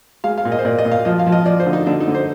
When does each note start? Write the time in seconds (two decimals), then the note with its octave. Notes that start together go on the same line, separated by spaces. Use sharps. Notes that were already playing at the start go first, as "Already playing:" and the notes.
0.24 G#3 F5
0.38 F5
0.45 A#2
0.52 D#5
0.59 C5
0.65 A#2 D5
0.78 D#5
0.85 A#2
0.91 F5
1.05 F3 D#5
1.19 F5
1.27 F3
1.32 D#5
1.46 F3 D5
1.60 C5
1.66 D3
1.73 D#4
1.87 D3 D4
2.00 D#4
2.08 D3
2.14 C5